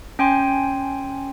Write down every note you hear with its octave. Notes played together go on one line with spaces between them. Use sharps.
C#4 G5 G#5 C6